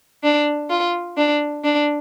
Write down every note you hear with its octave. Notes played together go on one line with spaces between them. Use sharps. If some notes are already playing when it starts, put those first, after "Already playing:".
D4
F4
D4
D4